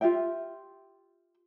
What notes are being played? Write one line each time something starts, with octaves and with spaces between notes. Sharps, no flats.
F4 G4 E5 G5